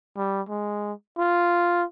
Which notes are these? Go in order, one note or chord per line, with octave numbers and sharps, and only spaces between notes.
G3
G#3
F4